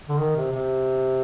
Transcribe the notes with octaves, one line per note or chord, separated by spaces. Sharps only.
D3
D#3
C3
C3